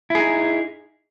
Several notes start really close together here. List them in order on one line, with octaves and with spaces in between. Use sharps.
E4 G#4 D#4